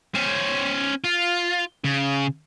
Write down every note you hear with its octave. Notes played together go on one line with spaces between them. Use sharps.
C#4 C5
F4
C#3